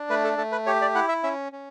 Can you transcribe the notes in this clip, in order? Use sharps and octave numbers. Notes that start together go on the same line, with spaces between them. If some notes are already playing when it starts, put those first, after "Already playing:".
Already playing: D4
A3 B4
A4
A3 A4
B4
G4 C#5
D5
E4 F#5
E5
C#4 E5
C#4